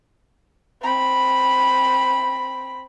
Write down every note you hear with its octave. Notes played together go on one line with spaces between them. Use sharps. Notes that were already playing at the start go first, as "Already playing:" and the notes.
C4 B5